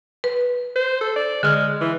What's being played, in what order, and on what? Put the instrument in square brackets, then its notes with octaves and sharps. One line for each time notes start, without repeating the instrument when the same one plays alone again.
[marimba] B4
[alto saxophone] C5
A4
D5
[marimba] D3 F6 [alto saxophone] G#3
[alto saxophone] E3